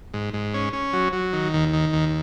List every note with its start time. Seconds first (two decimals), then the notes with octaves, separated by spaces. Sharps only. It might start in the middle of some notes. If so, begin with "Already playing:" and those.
0.14 G#2
0.33 G#2
0.54 C#4
0.73 C#4
0.93 F#3
1.13 F#3
1.33 D#3
1.54 D#2
1.73 D#3
1.93 D#2